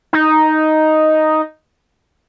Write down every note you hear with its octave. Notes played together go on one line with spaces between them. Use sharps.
D#4